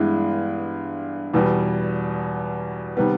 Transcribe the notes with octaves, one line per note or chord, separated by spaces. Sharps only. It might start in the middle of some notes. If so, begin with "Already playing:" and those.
Already playing: G2 E3 G#3 B3 E4
E2 B2 G3
C3 D#3 G3 B3